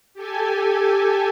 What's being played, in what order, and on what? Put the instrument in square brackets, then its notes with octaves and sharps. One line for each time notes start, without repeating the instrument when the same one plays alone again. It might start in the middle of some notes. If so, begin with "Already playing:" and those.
[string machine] G4 A4 G#5